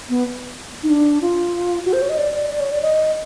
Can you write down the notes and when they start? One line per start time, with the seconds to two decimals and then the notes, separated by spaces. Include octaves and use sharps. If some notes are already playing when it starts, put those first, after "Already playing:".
0.09 B3
0.83 D#4
0.89 D4
1.21 F4
1.86 F#4
1.93 C5
2.02 C#5
2.10 D#5
2.18 D5
2.34 D5
2.50 D5
2.60 C#5
2.71 D5
2.82 D#5